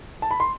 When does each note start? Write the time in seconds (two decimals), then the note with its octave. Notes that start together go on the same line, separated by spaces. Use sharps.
0.22 A5
0.31 B5
0.40 C6